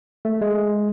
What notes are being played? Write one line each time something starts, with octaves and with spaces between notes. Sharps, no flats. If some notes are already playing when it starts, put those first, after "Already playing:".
A3
G#3